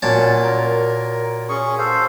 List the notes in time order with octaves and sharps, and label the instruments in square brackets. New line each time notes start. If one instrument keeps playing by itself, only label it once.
[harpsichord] A#2 F#3 A5 [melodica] C#4
[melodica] A#4
C#4 G#4 C#6
A4 C5 F5